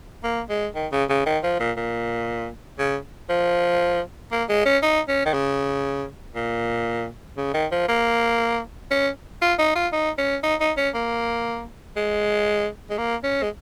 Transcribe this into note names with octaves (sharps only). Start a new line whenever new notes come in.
A#3
G#3
D#3
C#3
C#3
D#3
F3
A#2
A#2
C#3
F3
A#3
G#3
C#4
D#4
C#4
D#3
C#3
A#2
C#3
D#3
F3
A#3
C#4
F4
D#4
F4
D#4
C#4
D#4
D#4
C#4
A#3
G#3
G#3
A#3
C#4
G#3